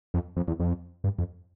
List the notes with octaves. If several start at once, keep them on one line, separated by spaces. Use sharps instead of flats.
F2
F2
E2
F2
G2
F2